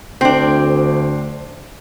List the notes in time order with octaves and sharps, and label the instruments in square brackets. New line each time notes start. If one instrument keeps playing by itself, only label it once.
[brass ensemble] D2 [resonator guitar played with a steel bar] C4 D4